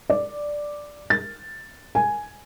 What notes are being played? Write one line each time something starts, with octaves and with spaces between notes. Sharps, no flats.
D5
A6
G#5